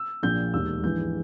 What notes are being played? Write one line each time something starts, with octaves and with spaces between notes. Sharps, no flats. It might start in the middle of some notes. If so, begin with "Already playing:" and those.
Already playing: E6
A#1 A#2 G6
E1 D#2 D#3 E6
A#1 G#2 E3 G6